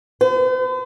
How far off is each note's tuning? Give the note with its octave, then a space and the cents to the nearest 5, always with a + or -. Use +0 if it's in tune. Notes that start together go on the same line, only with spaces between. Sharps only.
C5 -45